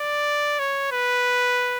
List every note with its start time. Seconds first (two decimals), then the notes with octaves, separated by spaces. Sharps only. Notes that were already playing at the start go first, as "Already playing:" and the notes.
Already playing: D5
0.59 C#5
0.92 B4